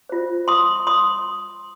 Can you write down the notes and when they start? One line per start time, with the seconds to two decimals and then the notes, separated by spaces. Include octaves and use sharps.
0.09 F4 C5
0.48 C6 D#6
0.87 C6 D#6